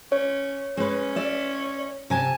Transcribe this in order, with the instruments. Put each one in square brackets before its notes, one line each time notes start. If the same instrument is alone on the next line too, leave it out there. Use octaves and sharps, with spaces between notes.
[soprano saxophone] C#4 [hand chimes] C#5
[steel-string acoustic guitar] G#3 B4 [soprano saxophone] C#4
[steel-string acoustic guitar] D5 E5
C3 G#5 A5